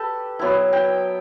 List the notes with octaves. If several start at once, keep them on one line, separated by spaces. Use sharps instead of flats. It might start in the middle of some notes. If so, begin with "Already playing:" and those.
Already playing: G4 A4 B4
F#3 B3 E4
G5